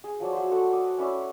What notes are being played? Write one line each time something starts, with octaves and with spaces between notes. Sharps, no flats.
G#4
F3 F#3 D5
C5 D5 E5 F#5
A3 F#4 A4
D6 D#6
C#4 E4 D5 E5